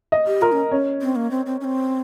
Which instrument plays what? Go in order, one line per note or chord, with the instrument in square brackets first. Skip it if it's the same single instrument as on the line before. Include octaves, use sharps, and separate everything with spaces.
[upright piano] D#5
[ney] G4
[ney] F4 [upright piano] A#4
[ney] C#4
[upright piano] C#4
[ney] C4
A#3
C4
C4
C#4
C4